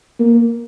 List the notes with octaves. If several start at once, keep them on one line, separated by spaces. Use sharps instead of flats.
A#3